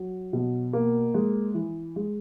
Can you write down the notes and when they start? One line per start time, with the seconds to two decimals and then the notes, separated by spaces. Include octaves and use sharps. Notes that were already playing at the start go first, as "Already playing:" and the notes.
Already playing: F#3
0.33 B2
0.73 A#3
1.14 G#3
1.54 E3
1.96 G#3